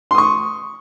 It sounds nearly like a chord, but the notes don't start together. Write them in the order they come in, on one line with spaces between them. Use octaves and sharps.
C6 D#6 C#6